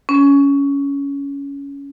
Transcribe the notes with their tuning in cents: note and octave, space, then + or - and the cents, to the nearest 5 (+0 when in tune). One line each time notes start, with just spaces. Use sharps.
C#4 +15